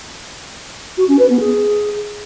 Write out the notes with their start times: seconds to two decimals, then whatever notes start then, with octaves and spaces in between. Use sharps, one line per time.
0.98 F#4
1.08 C#4
1.19 B4
1.29 B3
1.40 G#4